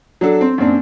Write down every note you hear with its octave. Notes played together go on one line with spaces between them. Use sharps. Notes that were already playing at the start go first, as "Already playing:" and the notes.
F#3 D4 A4
C4
F#2 A#2 C4 D4